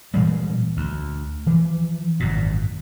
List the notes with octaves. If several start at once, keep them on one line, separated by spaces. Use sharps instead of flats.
A#2 E3 G3 G#3
D2
E3 F3
G#1 F#2 A#2